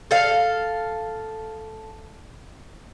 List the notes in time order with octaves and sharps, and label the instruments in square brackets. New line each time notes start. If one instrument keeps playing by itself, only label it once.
[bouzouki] A4 F5